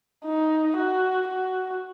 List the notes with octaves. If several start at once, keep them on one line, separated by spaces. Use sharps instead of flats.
D#4
F#4
F#4